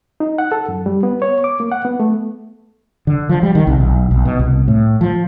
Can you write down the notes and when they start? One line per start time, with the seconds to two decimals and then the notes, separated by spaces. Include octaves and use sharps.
0.20 D#4
0.38 F#5
0.52 A4
0.68 F#2
0.86 G3
1.03 B3
1.22 C#5
1.44 D6
1.60 A#3
1.72 F#5
1.85 B3
2.00 A3
3.07 D3
3.29 F3
3.43 G3
3.55 D#3
3.67 C2
3.80 B1
4.11 B1
4.25 B2
4.39 C2
4.68 A2
5.01 F3